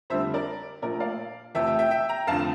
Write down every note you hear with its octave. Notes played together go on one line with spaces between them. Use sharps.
F2 D3 G3 C5 E5
A#4 D5
A#1 A#2 F3 A3 A#4 D5
D5 F5
F2 C3 E3 A3 E5 G5
E5 G5
E5 G5
E5 G5
G5 A#5
F1 F2 D3 F5 A5